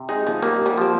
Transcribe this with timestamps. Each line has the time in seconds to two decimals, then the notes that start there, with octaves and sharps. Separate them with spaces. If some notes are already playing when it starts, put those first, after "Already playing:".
Already playing: C3
0.09 G#3 D#4
0.27 F3
0.43 G3 A#3
0.66 G3
0.77 F3 C4